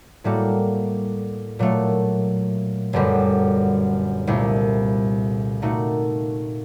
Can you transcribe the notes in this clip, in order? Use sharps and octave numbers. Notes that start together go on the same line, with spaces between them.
A2 G3 A#3 F#4 A4
A#2 F#3 A3
G1 F#2 D3 G3
C2 A#2 A3
A#2 A3 D#4 F#4